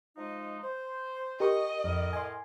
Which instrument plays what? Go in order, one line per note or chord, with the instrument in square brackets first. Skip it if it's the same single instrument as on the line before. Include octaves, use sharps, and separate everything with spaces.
[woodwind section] F3 G#3 D#4
C5
[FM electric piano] G4 A#4 C#6 [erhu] D#5
[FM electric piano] F2 [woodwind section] A2 A#4
[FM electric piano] G#5 C6